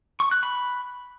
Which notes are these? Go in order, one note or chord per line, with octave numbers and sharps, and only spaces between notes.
C#6
F#6
B5